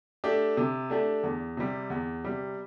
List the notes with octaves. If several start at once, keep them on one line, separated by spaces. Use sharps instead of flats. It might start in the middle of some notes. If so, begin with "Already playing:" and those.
A3 D4 G4
C3
A3 D4 G4
E2
C3 G3
E2
C3 G3